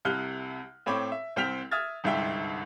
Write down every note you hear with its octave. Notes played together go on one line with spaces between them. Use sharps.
C2 C3 F6 F#6 G7
A2 C4 C#5 B5 D6
E5
C2 C4 G5 F6 B6 F7
E5 D#6 F6 G#6 A6
G1 C2 G#2 E5 G5